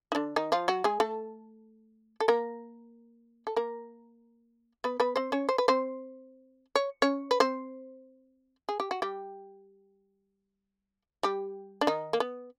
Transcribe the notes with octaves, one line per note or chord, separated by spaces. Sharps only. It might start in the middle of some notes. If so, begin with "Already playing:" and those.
D#4
D3 D4
D#3 D#4
F3 F4
F#3 F#4
G#3 G#4
A3 A4
A4
A#3 A#4
A4
A#3 A#4
B3 B4
B3 B4
C4 C5
C#4 C#5
C5
B4
C4 C5
C#5
C#4 C#5
B4
C4 C5
G#4
G4
F#4
G3 G4
G3 G4
D4
D#3 D#4
A#3
B3